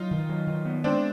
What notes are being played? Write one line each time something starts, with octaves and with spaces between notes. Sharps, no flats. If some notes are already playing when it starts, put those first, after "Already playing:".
Already playing: F#3 D#4 F4
D#3
F#3
D#3
B3
G#3 C4 D4